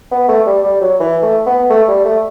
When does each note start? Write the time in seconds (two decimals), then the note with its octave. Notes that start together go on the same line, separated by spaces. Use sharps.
0.12 B3
0.28 A3
0.46 G3
0.64 G3
0.81 F#3
1.00 E3
1.22 A3
1.46 B3
1.70 A3
1.88 G3
2.05 A3